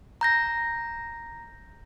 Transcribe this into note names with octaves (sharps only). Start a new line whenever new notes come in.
A#5 G6 A#6